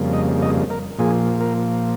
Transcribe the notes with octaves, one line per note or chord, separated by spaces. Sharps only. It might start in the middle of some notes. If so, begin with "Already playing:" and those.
Already playing: F2 C#3 G3 A#3
D#5
D#5
A#4
A#2 F3 A#3 G#4
A#4